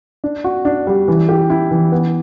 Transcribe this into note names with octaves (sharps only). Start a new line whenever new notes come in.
D4
F#4
D4
G3
E3
G4
E4
E3
B3